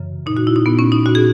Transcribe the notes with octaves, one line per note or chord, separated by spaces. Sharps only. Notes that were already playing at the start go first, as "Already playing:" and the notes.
Already playing: F#2 C#3 E3
A#2 D#4
F#4
E4
D#4
A#2 B3
C#4
D#4
A#2 F#4
G#4